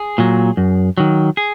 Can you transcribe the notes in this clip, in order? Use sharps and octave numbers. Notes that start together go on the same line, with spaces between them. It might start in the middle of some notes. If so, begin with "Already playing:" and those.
Already playing: G#4
A#2 F#3
F#2
D#3 F#3
G#4